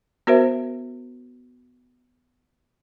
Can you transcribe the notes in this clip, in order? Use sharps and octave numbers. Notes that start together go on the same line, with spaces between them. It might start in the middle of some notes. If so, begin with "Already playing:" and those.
B3 F#4 A#4 C5 E5